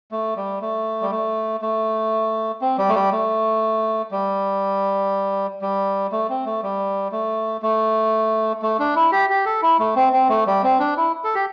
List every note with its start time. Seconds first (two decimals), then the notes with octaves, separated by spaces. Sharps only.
0.12 A3
0.37 G3
0.62 A3
1.02 G3
1.11 A3
1.62 A3
2.61 C4
2.78 G3
2.89 A3
2.95 G3
3.12 A3
4.11 G3
5.62 G3
6.12 A3
6.30 C4
6.46 A3
6.63 G3
7.12 A3
7.62 A3
8.62 A3
8.80 D4
8.96 E4
9.12 G4
9.30 G4
9.46 A4
9.62 E4
9.79 A3
9.96 C4
10.13 C4
10.29 A3
10.47 G3
10.63 C4
10.79 D4
10.97 E4
11.24 A4
11.35 G4